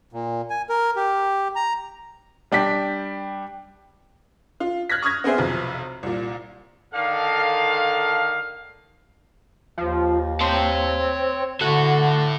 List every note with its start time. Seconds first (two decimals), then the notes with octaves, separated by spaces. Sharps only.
0.13 A#2
0.50 G#5
0.69 A#4
0.96 G4
1.56 A#5
2.52 G3 D4 G5 B6
4.60 F4
4.90 F6 F#6 G#6 A#6 B6
5.03 C#6 D#6 F6 G#6 A#6
5.24 B3 C4 G#4 C5 E5
5.38 B1 F2 C3
6.03 C2 A#2
6.94 D3 D#3 A4 F5
9.78 D#2 F3
10.41 C4 C#5 A5
11.61 D3 E4 F#4 A4